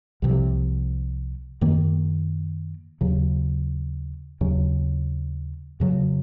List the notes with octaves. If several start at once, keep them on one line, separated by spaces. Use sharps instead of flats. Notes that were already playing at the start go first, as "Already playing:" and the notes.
C2 C3 F3
F#2 D#3 A#3
D#2 C#3 F#3
D#2 C#3 F#3
F2 C#3 F#3